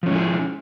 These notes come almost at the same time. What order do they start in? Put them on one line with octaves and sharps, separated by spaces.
F3 C#4 G#3 E4 G#4